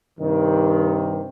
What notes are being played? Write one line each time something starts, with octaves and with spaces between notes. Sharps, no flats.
G2 C3 D#3